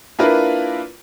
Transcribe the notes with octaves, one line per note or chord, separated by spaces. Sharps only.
A#3 D4 E4 F4 A#4 B4